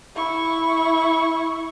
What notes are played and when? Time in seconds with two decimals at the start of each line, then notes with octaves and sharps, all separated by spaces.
0.15 E4 C#6